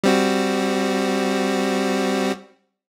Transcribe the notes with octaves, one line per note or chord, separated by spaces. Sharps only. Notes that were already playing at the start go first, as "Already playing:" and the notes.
G3 C4 F#4